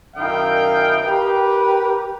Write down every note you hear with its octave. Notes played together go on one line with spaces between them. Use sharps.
F#2 D#3 E4 D#5 F5 G5
G4 A#4 B4